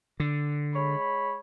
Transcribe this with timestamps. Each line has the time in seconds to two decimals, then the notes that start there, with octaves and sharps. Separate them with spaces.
0.20 D3
0.74 G#3 C#5 B5